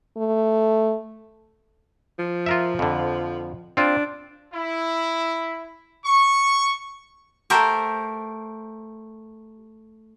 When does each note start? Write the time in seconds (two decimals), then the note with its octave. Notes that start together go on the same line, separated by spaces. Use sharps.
0.17 A3
2.19 F3
2.46 F4 A#4 E5
2.79 F2 D3
3.77 C4 D4 F4
4.53 E4
6.05 C#6
7.50 A3 G4 A#4 C5